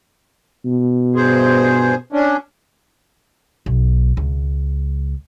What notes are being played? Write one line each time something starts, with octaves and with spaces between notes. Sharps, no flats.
B2
G2 G#4 C5
C#4 D4
B1
C#2